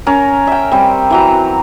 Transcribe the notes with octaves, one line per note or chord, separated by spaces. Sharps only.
C#4 A#4
E5 G5
G3 C4
E3 F#3 A#5